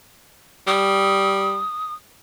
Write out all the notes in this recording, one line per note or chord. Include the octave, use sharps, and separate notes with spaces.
G3 D#6